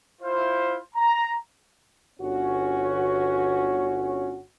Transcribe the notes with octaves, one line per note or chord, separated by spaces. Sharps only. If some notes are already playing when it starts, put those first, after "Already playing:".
E4 F4 C5
A#5
G1 C#4 F#4